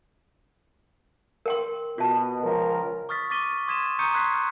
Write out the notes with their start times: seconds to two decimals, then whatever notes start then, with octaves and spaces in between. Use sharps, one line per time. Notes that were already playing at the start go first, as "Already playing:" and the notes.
1.46 A#4 G5 C6
1.98 B2 F4 A5
2.43 C#2 F3 A#4
3.09 C#6 D#6 F6 A6 B6
3.30 C#6 D6 A6 B6 D#7 G7
3.68 C6 D#6 G#6 B6 D#7 E7
3.99 A#5 C#6 D#6 G6 C#7 D#7
4.14 C6 F#6 G#6 B6 C7
4.33 F6 G6